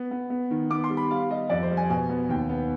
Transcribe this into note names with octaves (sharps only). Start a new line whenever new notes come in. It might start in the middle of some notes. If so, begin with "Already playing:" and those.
Already playing: B3
B3
B3
D#3
B3 D6
C6
G3
B5
G3 F5
G3 D#5
F2 D5
C5
G3
G#5
B2 G#5
B3
D#2 G5
B3